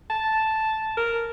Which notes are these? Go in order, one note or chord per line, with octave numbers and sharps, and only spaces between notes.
A5
A#4